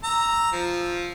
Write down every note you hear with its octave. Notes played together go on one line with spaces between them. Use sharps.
A#5 E6
F3